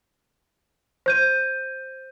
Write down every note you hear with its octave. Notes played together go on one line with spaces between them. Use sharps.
C5 G6 D#7